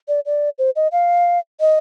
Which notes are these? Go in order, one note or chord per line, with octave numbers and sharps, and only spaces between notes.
D5
D5
C5
D#5
F5
D#5